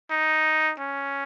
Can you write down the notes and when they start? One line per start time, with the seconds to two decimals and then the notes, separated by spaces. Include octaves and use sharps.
0.10 D#4
0.80 C#4